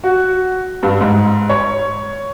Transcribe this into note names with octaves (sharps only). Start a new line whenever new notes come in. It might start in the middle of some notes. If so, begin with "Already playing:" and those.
F#4
G2
G#2
C#5